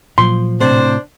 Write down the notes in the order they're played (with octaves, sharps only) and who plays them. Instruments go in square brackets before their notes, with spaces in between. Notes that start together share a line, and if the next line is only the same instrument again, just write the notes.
[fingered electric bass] A#2 F#3 [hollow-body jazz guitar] F3 [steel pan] C6
[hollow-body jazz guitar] A2 C3 [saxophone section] D4 C5